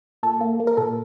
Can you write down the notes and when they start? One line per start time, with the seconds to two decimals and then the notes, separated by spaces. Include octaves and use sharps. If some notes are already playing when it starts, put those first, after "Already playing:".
0.23 A#2 A4
0.41 A#3
0.60 A#3
0.67 A#4
0.77 A#2 A4